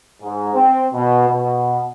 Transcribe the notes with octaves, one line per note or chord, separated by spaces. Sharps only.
G#2
C4
B2
B2